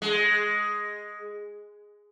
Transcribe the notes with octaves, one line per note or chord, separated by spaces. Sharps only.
G#3